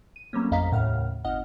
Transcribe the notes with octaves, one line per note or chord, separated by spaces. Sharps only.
D#7
F#3 G3 A3 A#3 C4 C#4
A1 F2 D#5 F5 A#5 B6
D#2 A2 C#3 F#5 F6
G1 D#5 F#5 F6